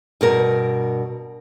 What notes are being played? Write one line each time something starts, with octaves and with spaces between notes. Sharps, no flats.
G2 B2 A#4